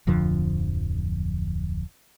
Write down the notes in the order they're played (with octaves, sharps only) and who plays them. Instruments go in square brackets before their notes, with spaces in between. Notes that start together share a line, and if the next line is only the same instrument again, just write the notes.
[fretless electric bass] D1 F2 D3 F3